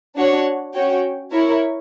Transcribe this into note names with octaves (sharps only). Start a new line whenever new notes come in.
D4 F#4 C#5 F#5
C#4 F#4 C#5 G5
E4 A#4 C#5